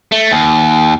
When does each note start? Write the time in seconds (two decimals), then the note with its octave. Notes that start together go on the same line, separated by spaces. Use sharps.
0.12 A3
0.32 D#2